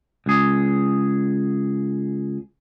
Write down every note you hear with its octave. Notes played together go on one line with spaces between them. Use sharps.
C#2 G#4